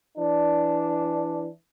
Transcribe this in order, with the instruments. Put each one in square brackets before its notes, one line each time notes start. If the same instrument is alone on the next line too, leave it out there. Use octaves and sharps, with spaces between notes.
[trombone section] E3 D4